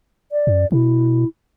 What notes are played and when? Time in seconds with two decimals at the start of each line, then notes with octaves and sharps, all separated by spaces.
0.32 D5
0.47 F#2
0.72 B2 E4